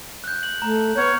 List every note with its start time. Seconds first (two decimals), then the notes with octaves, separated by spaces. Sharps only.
0.24 F#6 G6
0.43 F#7
0.62 A3 A#5
0.96 B3 C#5 F6 G6